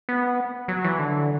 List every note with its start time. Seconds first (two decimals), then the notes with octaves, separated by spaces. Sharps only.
0.09 B3
0.68 F#3
0.84 E3
0.99 D3